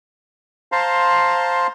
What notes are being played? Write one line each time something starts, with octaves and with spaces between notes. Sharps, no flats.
C5 F5 A5 A#5 C6